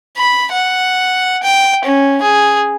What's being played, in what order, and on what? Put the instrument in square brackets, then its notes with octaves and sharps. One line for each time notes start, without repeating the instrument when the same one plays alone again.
[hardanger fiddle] B5
F#5
G5
C#4
G#4